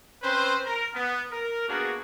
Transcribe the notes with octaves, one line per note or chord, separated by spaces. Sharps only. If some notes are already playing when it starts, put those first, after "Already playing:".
C4 C#4 B4 C5
A#4
B3
A#4
A#3 B3 D4 F#4 G#4